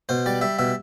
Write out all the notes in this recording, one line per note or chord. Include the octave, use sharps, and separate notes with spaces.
B2 C5
G3 D5
G3 E5
B2 E5